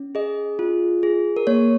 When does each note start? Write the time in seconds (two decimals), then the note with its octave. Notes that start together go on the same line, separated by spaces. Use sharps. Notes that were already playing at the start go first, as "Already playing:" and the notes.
Already playing: C#4
0.15 G#4 D#5
0.59 F4
1.03 G#4
1.36 A#4
1.47 A#3 C#5